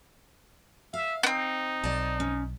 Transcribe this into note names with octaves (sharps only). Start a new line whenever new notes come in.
E5 F5
B3 C4 D#4
B1 D5 A5
C#4